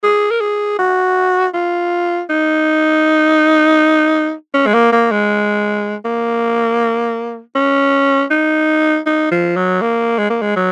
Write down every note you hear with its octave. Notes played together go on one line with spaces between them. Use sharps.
G#4
A#4
G#4
F#4
F4
D#4
C#4
G#3
A#3
A#3
G#3
A#3
C#4
D#4
D#4
F3
F#3
A#3
G#3
A#3
G#3
F#3